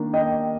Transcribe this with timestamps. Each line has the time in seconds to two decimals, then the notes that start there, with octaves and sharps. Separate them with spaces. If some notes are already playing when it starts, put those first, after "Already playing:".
Already playing: D#3 A#3 D4
0.13 D#5 G5